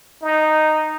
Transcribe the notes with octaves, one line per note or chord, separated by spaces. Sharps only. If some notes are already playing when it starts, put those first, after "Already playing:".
D#4